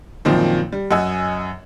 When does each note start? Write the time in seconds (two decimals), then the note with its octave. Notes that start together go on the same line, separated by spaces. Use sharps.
0.25 F#2 A#2 D#3 F3 C4
0.73 G3
0.91 F#2 D#5 F#5 G#5 E6